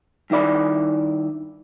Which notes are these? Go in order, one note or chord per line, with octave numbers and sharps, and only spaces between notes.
G2 D#3 E4 D5 B5